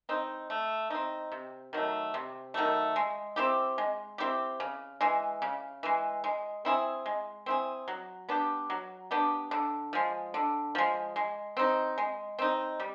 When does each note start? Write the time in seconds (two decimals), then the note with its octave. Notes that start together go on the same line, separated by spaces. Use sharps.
0.09 C4 D#4
0.50 A3
0.90 C4 D#4
1.32 C3
1.73 D#3 F#3 A3
2.14 C3
2.54 D#3 F#3 A3
2.96 G#3
3.36 C4 E4 G4
3.78 G#3
4.18 C4 E4 G4
4.60 C#3
5.01 E3 G#3
5.42 C#3
5.83 E3 G#3
6.24 G#3
6.65 C4 E4 G#4
7.06 G#3
7.46 C4 E4 G#4
7.88 F#3
8.29 B3 D4 G4
8.70 F#3
9.11 B3 D4 G4
9.51 D3
9.93 F3 G#3
10.34 D3
10.75 F3 G#3
11.16 G#3
11.57 C4 D#4
11.98 G#3
12.39 C4 D#4
12.80 G3